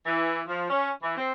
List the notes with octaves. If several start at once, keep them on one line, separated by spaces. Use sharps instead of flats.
E3
F3
C#4
E3
C4